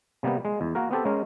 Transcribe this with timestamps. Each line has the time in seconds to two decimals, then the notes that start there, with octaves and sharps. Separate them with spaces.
0.23 C3 G3 A#3 B3
0.45 G#3
0.61 E2
0.75 A#3 F#4 A#4
0.91 B3 C4 G4 A4
1.05 G#3 C#4 A#4